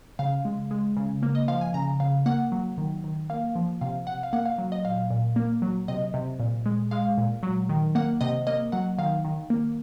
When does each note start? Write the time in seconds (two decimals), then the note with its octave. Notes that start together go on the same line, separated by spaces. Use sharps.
0.19 C#3 F5
0.45 G#3
0.71 G#3
0.97 C#3
1.23 A#3
1.35 D#5
1.48 F3 F5
1.61 G#5
1.74 C#3 A#5
2.00 C#3 F5
2.26 A#3 F#5
2.52 F#3
2.78 D#3
3.04 D#3
3.30 A#3 F5
3.55 F3
3.81 C3 F5
4.07 C3 F#5
4.23 F5
4.33 A#3 F#5
4.46 F5
4.58 F#3
4.72 D#5
4.85 A#2 F5
5.11 A#2
5.36 A#3
5.62 F#3
5.88 C3 D#5
6.14 C3
6.40 A#2
6.66 G#3
6.91 G#3 F5
7.18 A#2
7.43 F#3
7.69 D#3
7.95 A#3 F#5
8.21 C3 D#5
8.47 A#3 D#5
8.72 F#3 F#5
8.98 D#3 F5
9.25 D#3
9.50 A#3